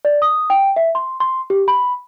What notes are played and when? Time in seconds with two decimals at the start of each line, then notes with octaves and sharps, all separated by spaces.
0.05 D5
0.22 D#6
0.50 G5
0.76 E5
0.95 C6
1.20 C6
1.50 G4
1.68 B5